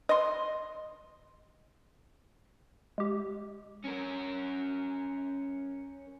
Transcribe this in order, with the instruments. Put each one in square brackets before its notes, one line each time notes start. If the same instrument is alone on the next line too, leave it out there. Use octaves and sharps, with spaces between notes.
[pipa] D#5 C6
[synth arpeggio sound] G#3 G4
[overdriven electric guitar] C#4 A#4